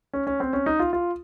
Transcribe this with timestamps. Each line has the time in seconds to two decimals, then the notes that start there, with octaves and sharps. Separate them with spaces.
0.13 C#4
0.27 C#4
0.40 C4
0.53 C#4
0.66 D#4
0.80 F4
0.93 F4